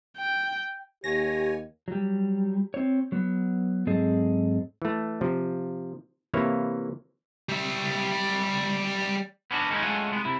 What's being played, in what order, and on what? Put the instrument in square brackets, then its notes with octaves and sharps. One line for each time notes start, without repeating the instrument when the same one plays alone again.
[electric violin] G5
[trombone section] D#2 [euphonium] G4 [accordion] C#5 G#5 [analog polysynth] A#6
[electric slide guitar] F#3 G3
C4 C#5
F#3 B3
G#2 F#3 C4 G#4 A4 D#5
[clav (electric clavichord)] E3 A3
C3 F3
C3 E3 A#3 E4 C#5 F5
[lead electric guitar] G3 E5
[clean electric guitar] B3 C#4 D4 F4 F#4
D#3 G#3 C#4 D#4 E4
G#3 A3 C#4 F4 F#5 G#5
C2 G#3 B3
C3 E4